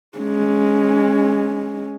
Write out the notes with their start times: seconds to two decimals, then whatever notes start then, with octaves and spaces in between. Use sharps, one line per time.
0.18 G#3 C#4